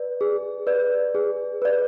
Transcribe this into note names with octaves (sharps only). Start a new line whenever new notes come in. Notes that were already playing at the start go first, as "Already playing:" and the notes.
Already playing: B4 D5
G#4
B4 D5
G#4
B4 D5